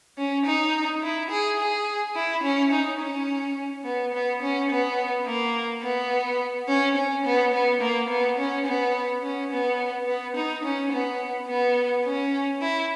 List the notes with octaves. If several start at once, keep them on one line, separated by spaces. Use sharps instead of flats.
C#4
D#4
E4
G#4
G#4
E4
C#4
D#4
C#4
B3
B3
C#4
B3
A#3
B3
C#4
C#4
B3
B3
A#3
B3
C#4
B3
C#4
B3
B3
D#4
C#4
B3
B3
C#4
E4